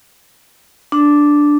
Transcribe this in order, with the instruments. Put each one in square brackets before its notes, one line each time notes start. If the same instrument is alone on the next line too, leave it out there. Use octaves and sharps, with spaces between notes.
[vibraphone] D4